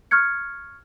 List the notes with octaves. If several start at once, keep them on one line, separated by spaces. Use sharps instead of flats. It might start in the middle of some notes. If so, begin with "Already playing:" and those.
C#6 F6 F#6 G#6 C#7